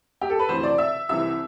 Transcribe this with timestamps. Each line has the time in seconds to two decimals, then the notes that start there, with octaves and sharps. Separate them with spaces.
0.21 G4
0.30 A4
0.39 B4
0.48 E1 D2 C3 E3 C5
0.63 D5
0.78 E5
1.09 C2 C3 E3 E5